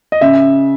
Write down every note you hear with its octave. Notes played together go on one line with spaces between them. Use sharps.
D#5
C#3 E5